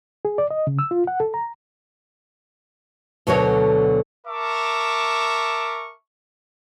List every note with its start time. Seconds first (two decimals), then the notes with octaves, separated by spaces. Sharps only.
0.25 G#4
0.38 D5
0.51 D#5
0.67 C#3
0.79 E6
0.91 F4
1.07 F#5
1.20 A4
1.34 A#5
3.27 D2 B2 D3 F#3 A#4 C#5
4.27 A#4 E5 A5 C#6 D6